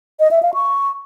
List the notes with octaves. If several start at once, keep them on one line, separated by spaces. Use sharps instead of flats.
D#5
E5
F5
C#6